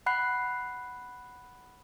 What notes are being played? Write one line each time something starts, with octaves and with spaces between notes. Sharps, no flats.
F#5 B5 F#6 C7